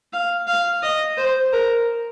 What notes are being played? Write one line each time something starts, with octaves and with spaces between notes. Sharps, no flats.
F5
F5
D#5
C5
A#4